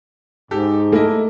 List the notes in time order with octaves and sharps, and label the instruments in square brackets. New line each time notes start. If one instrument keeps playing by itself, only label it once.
[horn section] G#2 [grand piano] G4 A4
[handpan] A3 A4 [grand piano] A#3 E4 D#5